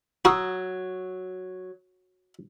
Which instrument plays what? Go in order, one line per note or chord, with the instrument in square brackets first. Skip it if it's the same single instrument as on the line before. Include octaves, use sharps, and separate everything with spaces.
[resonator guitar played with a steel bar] F#3 [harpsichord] F#4 [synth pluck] A#5 D#6 E6